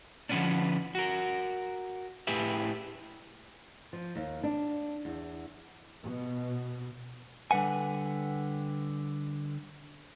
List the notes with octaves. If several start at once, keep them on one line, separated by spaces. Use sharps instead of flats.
D3 F3 G#3 B3 C#4 D4
F#4 A#4
A2 E4 G4 G#4 B4 E5
F3
D#2
D4
E2
B2
D3 G3 B4 F#5 G#5